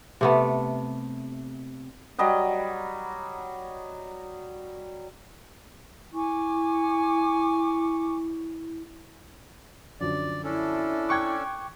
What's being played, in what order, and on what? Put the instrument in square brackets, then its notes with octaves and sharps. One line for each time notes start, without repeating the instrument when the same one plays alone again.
[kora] C3 A3 B3
[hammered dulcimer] F#3 G3 D#5 F#5
[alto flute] E4 [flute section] G#5 C#6 D6
[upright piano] F#2 D3 F3 [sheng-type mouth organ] D5
[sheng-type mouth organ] C#4 D4 A4 [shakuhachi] E4
[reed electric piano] G5 C#6 D6 [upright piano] F#6 G#6